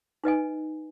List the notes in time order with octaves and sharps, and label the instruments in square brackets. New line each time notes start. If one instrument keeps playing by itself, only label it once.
[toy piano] D#4 B4 D#5 G#5